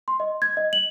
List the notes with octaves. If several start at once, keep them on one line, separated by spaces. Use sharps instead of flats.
C6
D#5
G#6
D#5
F#7